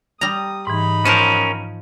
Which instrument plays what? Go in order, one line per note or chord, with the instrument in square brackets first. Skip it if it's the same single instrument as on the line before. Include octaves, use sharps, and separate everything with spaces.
[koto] G3 A#5 [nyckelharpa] D#6
[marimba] G#2 E3 [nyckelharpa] D#4 B5
[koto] F3 C5 A5 [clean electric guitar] C#4 A#4